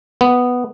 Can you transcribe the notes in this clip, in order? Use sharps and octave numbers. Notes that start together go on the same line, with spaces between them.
B3